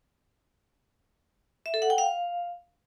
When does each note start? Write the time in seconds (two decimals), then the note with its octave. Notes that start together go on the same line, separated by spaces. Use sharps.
1.66 E5
1.74 A4
1.82 F#5
1.90 G5
1.98 F5